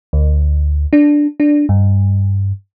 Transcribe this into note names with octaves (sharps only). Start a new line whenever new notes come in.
D2
D4
D4
G2